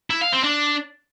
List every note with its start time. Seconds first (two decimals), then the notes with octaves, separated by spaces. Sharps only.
0.10 E4
0.21 F5
0.32 C4
0.44 D4